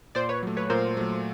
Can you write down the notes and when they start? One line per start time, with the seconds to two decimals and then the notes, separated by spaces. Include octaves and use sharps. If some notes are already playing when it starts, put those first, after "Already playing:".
0.15 A#2 C5 D5
0.29 B4 C#5
0.43 F#3 A3
0.57 B4 C#5
0.70 A#2 A#4 C5
0.97 F#3 A3